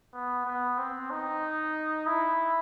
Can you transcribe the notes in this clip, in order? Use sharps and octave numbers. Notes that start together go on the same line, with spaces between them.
B3
B3
C4
D#4
E4